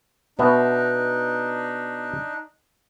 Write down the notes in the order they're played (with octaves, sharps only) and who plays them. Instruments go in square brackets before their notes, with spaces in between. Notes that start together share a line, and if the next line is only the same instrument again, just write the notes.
[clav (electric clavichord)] B2 B3 E5 [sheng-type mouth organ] D4 D#4